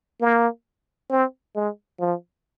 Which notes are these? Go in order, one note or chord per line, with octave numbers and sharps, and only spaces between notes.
A#3
C4
G#3
F3